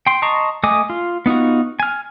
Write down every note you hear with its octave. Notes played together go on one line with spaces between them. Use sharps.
G5 C6
D#5 A5 A#5 C6 C#6
A3 D#5 G#5 D6 D#6
F4
B3 D#4 F4 F#4
G#5 F6